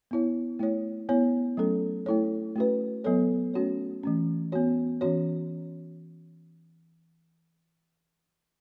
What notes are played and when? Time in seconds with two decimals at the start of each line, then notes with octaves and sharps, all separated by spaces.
0.11 B3 E4 C#5
0.59 A3 E4 C#5
1.09 B3 E4 C#5
1.57 F#3 A3 C#4 A4
2.06 A3 E4 A4 C#5
2.56 A3 C#4 F#4 B4
3.04 F#3 B3 A4 C#5
3.54 A3 C#4 F#4 C#5
4.03 E3 A3 C#4
4.52 B3 F#4 C#5
5.01 E3 C#4 F#4 C#5